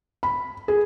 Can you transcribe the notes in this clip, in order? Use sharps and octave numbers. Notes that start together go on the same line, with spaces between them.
B5
G#4